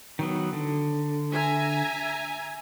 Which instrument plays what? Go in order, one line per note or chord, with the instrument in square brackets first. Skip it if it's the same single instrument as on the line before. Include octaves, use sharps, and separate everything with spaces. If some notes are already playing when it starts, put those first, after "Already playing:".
[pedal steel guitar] D#3 F#3 B3
D3
[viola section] E5 G#5 A#5